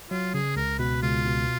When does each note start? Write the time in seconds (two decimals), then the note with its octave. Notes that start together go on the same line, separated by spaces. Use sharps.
0.10 F#3 F4
0.34 C#3 G#4
0.56 C#2 A#4
0.79 B2 B4
1.02 C#2 F4
1.25 B2